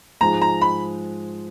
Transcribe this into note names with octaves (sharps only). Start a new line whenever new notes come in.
G#2 F3 G#3 A#5
A#5
B5